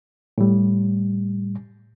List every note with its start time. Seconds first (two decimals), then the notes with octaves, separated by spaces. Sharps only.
0.38 A2 G3